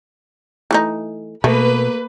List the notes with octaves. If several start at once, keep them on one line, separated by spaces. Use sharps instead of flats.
E3 A3 D#4
B2 A3 A#3 B4